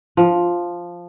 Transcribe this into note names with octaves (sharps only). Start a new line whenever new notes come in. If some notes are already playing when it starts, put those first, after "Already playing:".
F3